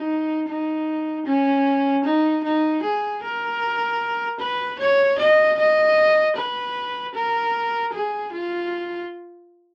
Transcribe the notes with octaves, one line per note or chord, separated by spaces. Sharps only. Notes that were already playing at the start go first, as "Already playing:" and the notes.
Already playing: D#4
D#4
C#4
D#4
D#4
G#4
A#4
B4
C#5
D#5
D#5
B4
A#4
G#4
F4